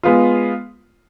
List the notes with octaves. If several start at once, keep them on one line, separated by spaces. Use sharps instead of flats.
G#3 B3 F4